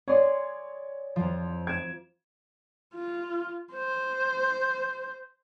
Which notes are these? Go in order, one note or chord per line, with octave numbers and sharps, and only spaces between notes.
G#4 C#5 D5 C6
F2 F3
G#6 D7 E7
F4
C5